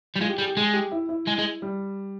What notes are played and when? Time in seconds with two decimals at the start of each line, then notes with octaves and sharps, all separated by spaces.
0.16 G3
0.20 G#3 F4
0.29 G4
0.38 G3 G#4
0.48 G4
0.56 G#3 G#4
0.73 G4
0.92 E4
1.09 E4
1.28 G#3
1.39 G#3
1.62 G3